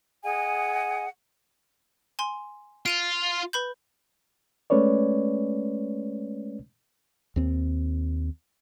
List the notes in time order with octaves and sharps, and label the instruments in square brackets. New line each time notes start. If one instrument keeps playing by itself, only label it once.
[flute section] G#4 D#5 F#5 G#5
[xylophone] G#5 C6
[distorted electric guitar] F4 [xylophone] D7 D#7 F7
[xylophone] B4 B5 G6
[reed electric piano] G#3 A3 C#4 B4 C#5 D5
[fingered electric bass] D#2 C4